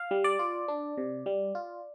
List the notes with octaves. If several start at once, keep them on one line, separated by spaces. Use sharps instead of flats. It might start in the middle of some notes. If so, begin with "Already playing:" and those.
Already playing: F5
G3
D5
F4
D4
C3
G3
F4